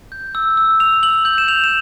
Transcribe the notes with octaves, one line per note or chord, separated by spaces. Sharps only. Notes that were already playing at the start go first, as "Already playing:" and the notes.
G6
E6
E6
E6 F7
E6 F#7
G6 F#7
E7
G6 F7
E7